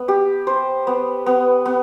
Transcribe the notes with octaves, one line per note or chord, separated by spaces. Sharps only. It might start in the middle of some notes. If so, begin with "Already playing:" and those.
Already playing: B3
G4
C5
B3
B3
B3